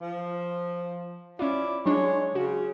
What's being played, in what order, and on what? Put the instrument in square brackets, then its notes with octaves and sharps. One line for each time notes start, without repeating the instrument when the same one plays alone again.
[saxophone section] F3
[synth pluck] C#4 F4 [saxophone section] E4 D5
[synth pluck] F#3 D4 [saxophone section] G#3 C#5
[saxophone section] C#3 [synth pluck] F#4